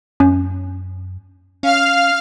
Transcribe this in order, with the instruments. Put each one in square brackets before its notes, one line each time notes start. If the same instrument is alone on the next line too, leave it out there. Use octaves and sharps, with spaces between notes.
[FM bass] F#2 [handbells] C#4
[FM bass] C#4 [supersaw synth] F5 F6